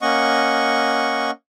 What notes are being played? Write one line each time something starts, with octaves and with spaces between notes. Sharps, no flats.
A#3 C#4 D#5 F#5 C#6